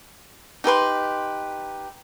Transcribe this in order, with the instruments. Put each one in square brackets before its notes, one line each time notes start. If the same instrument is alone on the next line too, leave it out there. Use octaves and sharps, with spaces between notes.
[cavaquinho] D#4 G4 B4 C6